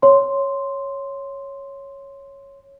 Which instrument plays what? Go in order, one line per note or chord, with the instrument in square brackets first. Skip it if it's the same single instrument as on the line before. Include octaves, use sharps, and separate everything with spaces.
[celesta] C#5 C6